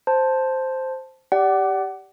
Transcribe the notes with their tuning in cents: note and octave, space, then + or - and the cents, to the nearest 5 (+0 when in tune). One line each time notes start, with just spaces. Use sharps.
C5 +0 A5 +0
G4 +0 D5 -10 F#5 +30